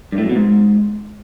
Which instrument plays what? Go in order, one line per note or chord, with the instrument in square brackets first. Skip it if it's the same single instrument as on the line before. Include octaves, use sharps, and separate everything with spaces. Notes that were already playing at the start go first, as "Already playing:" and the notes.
[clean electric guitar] G2
A2
F#2
B2
G#2